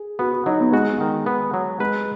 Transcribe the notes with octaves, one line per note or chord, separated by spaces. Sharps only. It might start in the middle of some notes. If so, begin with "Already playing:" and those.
Already playing: G#4
B3 F#4
F#4
F#3 D#4
B3
G#3 F#4
D#3
B3
F#3
G#3 B4